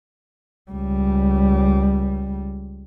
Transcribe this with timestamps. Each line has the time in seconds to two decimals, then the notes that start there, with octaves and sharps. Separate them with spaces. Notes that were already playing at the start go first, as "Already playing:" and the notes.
0.71 C#2 G3